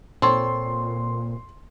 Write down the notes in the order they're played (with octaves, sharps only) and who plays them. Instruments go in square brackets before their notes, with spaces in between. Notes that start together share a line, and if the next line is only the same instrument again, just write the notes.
[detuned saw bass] A#2 [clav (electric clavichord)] C4 A4 C#5 [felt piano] C6